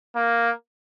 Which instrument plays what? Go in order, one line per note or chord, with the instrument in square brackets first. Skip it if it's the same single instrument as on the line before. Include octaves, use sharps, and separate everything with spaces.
[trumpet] A#3